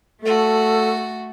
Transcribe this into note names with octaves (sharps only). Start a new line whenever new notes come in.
A3 F#4 A4